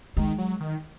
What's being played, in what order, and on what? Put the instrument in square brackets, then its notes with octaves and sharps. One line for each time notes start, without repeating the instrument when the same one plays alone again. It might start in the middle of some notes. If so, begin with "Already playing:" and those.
[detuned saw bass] D#3 [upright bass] G#3
[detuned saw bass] F#3
D#3